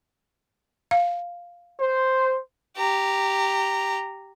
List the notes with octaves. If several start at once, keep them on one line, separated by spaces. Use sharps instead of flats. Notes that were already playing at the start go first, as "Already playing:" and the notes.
F5
C5
G4 A#5